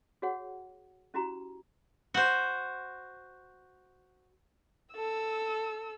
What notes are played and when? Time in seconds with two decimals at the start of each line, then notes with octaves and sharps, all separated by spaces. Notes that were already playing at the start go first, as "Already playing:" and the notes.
0.22 F#4 G#4 C#5 F#5
1.14 C#4 E4 F#4 G4 A#5
2.14 F#4 C5
4.94 A4 E6